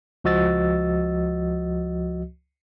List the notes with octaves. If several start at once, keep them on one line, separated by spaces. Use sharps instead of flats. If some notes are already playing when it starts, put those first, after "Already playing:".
C#2 F3 F#4 D#5 E6 A6